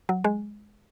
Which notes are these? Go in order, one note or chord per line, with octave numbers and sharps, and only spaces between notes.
F#3
G#3